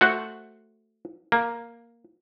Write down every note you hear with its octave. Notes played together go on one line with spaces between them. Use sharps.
A3 F#4 A4 C5 F#5
A#3